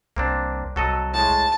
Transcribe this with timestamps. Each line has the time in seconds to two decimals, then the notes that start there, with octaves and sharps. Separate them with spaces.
0.16 C2 A#3 C4 D4
0.76 C2 F#3 A4 D#5
1.14 A2 G#3 A5